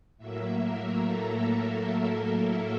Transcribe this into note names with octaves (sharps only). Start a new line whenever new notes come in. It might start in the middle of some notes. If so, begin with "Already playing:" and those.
A2 F#3 A#3 E5
A#4
A4
A#4